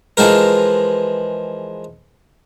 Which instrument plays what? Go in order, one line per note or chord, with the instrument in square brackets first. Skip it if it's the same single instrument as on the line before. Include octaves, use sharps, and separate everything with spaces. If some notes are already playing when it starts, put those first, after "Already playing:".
[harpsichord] E3 F3 G#3 A#4